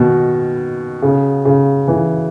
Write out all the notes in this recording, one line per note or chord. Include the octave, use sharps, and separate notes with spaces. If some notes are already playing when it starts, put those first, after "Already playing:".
Already playing: B2 D#3
C#3
C#3
E3